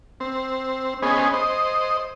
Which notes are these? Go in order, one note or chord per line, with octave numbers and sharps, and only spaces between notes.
C4
B3 C#4 G#4 C5 D#5
C5 D#5